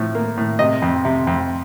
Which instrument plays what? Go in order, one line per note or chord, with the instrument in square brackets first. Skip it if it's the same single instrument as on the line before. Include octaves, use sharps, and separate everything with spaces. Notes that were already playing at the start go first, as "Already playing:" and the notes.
Already playing: [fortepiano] A2 F3
A#3
A2
C3 D#5
F2
C3
F2